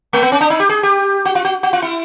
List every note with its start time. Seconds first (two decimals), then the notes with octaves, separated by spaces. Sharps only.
0.13 A3
0.22 B3
0.32 C#4
0.41 D4
0.50 D#4
0.60 G4
0.69 G#4
0.83 G4
1.25 F#4
1.35 F4
1.45 F#4
1.63 F#4
1.73 F4
1.82 E4